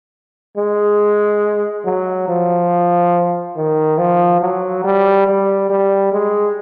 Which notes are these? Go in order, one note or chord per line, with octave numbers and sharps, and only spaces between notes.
G#3
F#3
F3
D#3
F3
F#3
G3
G3
G3
G#3